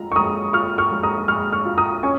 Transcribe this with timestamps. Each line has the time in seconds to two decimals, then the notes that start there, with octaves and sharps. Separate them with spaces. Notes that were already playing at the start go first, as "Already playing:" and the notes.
Already playing: G#3 F4 A#5
0.12 C#6
0.16 G#3 A#5 D#6
0.53 F4 C#6 F6
0.78 C#6 F6
0.91 G#3
1.03 A#5 D#6
1.28 G#3 C#6 F6
1.52 C#6 F6
1.65 F4
1.77 A#5 D#6
2.03 C#4 G#5 C#6